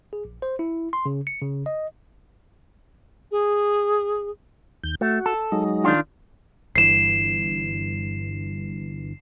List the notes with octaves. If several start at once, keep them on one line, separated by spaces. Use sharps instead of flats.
G#4
A#1
C5
E4
C6
C#3
C#7
C#3
D#5
G#4
D#2 G6
A3 F#4
A4
F#3 G#3 D#4
D#3 D4 F4
G1 G2 E3 C7 E7